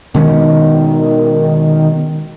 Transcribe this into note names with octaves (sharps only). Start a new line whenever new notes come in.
B2 D#3 G#3 C#4